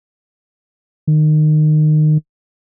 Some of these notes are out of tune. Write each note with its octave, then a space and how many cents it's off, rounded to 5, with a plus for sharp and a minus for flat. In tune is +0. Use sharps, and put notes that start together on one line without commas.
D#3 -25